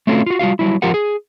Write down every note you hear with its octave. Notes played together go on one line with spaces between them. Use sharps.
A3 C4 C#4 F4 F#4 A4
F4 F#4
G3 F4 F#4 F5
F#3 G3 E4
F3 F4 G4 A#4 F#5
G#4